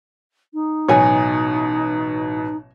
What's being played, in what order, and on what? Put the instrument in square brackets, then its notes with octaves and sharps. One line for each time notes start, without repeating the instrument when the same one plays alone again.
[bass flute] D#4
[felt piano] A1 B2 F#3 [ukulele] C#5 G#5